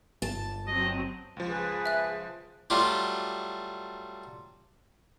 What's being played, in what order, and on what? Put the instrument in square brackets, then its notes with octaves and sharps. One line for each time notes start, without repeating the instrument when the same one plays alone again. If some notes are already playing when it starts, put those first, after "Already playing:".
[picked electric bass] G1 [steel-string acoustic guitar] A5
[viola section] F#3 C4 [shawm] D#5
[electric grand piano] C#2 F3
[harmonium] G#4 B4
[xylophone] E5 F#6
[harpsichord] F#3 G3 A3 F4 G4